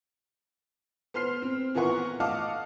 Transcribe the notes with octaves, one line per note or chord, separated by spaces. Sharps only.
B3 C5 C6 F6 C7
C4
A#2 E3 B3 A#4 F#5 C#6
D#5 F5 F#5 A5 D6 F6